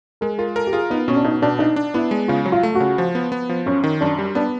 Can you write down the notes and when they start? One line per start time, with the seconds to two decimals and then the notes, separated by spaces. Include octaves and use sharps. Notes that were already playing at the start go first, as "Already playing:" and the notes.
0.21 G#3 A#4
0.38 F4 A#4
0.56 A4 A#4
0.67 G4
0.73 F4 G#4
0.90 B3 D#4
1.08 B2 C#4
1.16 D4
1.24 B2 D#4
1.42 B2 D4
1.59 D4 D#4
1.76 D4
1.94 B3 E4
2.11 G#3
2.28 C#3 F4
2.46 F#3
2.52 F4
2.63 A3
2.75 F#4
2.80 C#3
2.98 F3
3.15 B3
3.32 B3
3.49 F3
3.66 F#2 C#4
3.84 D#3
4.01 F#2 D4
4.19 G3
4.35 B3 D4